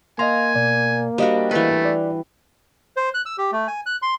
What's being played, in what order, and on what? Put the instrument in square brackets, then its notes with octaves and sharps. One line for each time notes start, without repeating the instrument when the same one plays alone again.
[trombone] A#3 [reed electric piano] D#5 F5 C6 [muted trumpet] G#5 [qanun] A#5
[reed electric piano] B2 D5
[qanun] G3 D4 F#4 [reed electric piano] C5 D#5 F5
[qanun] E3 B4 [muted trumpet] A3
[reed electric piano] D5
[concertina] C5
F#6
E6
G4
A3
G#5
F#6
C6